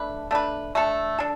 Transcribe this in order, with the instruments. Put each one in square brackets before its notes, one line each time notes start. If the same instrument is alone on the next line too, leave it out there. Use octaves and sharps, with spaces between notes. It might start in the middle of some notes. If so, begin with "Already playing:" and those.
Already playing: [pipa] A3 D4 B4
A3 D4 B4
A3 D4 A4
D4 A4